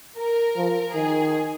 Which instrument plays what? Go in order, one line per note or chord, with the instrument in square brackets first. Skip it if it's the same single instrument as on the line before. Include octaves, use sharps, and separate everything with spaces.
[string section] A#4
[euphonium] F3
[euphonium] D#3 [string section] G#4